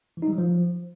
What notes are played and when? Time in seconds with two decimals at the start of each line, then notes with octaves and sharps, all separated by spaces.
0.17 E3
0.22 D#4
0.28 G3
0.33 F#3
0.38 F3